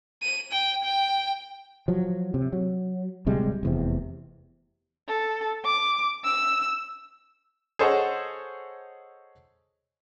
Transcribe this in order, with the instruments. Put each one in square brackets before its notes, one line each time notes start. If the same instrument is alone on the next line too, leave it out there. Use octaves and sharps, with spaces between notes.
[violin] D#7
G5
G5
[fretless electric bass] F3 F#3
C3
F#3
D1 C3 G3 G#3
F1 E2 C3
[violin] A4
D6
E6
[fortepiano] G#4 A4 C5 C#5 D#5 F#5